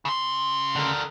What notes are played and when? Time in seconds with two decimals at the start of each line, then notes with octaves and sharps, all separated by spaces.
0.05 C#3 C6
0.76 D3 A#4